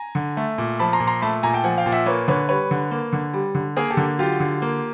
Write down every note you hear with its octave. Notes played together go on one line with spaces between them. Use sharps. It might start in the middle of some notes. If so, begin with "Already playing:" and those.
Already playing: G#5 A#5
D3
A3
A#2
F3 A5 B5
A#5 C6
A#2
A#5 C6
A3 A5 B5
A#2 G#5 A#5
G5 A5
F3 F#5 G#5
F5 G5
A#2
E5 F#5
A#3 B4 C#5
D3 B4 C#5
G3 B4 C#5
D3
A#3
D3
G3
D3
A#3 G#4 A#4
G4 A4
D3
F#3 F4 G4
D3
A#3